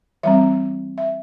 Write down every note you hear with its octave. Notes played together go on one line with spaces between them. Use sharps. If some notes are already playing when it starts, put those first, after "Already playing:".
E3 G3 C4 E5
E5